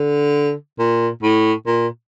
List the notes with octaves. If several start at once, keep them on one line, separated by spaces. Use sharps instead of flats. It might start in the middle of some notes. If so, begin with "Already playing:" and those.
Already playing: D3
A#2
A2
A#2